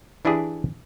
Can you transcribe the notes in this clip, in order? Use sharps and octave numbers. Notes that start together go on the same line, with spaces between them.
E3 D4 E4 G4 G#4